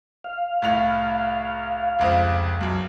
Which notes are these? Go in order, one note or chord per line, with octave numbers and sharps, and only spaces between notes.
F5
C2 A2 F7
F1 C#2 C4
B1 F#2